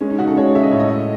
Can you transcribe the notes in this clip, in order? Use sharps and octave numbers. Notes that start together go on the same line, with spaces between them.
G#3 C#4
D#4
C#3 F#4
A4
G#3 C#5
C#3 E5
D#5
A2 C#5
D#5
A3